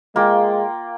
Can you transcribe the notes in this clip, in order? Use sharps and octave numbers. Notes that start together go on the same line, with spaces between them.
G#3 A#3 F4 G5